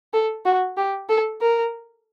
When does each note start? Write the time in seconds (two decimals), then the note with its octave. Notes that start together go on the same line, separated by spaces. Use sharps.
0.13 A4
0.45 F#4
0.77 G4
1.09 A4
1.42 A#4